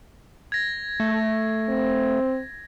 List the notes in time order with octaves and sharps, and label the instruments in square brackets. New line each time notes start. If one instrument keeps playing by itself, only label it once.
[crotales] G#6 A#6
[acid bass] A3
[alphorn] C4